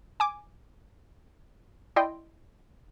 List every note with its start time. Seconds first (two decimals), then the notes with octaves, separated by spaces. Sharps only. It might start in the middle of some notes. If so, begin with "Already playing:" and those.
0.20 G#5 D6
1.96 E4 D5 D#5 G5 C6